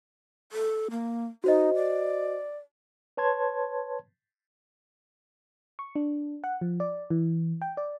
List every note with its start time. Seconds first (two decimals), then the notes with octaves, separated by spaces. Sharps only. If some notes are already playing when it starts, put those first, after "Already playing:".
0.52 A4
0.91 A#3
1.44 D#4 F#4 C5 D#5
1.75 D5
3.17 B4 C#5 A5 C6 G#6
5.79 C#6
5.95 D4
6.44 F#5
6.61 F3
6.80 D5
7.10 E3
7.62 G5
7.77 D5